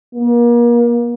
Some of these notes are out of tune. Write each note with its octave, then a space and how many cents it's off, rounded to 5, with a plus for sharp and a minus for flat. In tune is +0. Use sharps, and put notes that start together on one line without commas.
A#3 +35